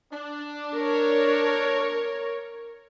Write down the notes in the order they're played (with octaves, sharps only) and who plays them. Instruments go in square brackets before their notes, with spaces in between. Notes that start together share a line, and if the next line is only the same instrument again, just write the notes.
[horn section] D4
[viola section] A#4 C#5